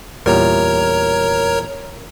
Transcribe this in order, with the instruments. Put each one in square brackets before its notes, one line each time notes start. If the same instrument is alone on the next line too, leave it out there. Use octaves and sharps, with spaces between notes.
[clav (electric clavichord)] E2 A#2 G3 [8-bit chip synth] A#4 C#5 A#5